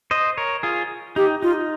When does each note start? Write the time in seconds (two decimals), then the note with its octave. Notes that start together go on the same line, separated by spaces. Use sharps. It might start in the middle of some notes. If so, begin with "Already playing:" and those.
0.11 C5 D#5
0.38 A#4 C#5
0.63 F4 G#4
1.16 D#4 G4
1.42 D#4 F4